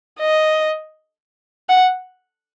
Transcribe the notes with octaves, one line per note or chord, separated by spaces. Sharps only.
D#5
F#5